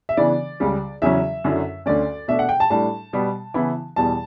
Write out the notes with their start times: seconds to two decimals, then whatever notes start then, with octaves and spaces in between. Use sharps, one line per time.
0.09 E5
0.17 C#3 E3 B3 D4 D5
0.60 C#2 C#3 G3
1.02 E2 C#3 F#3 C#4 E5
1.44 F#2 D3 F#3 C#4 E4
1.86 D2 D3 A3 C#4 D5
2.28 B2 A3 D4 E5
2.39 F#5
2.49 G5
2.60 A5
2.70 A2 G3 D4 A5
3.13 B2 G3 B3
3.54 C#3 E3 B3 E4
3.96 E2 B2 G3 A5